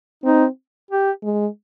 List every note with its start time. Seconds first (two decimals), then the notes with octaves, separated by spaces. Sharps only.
0.24 C4 D#4
0.91 G4
1.24 G#3